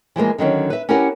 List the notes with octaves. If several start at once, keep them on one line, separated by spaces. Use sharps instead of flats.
E3 F3 G#3 A#3
D3 D#3 F#3 C#4
B4 E5
C#4 E4 G4 A#4 B4 F#5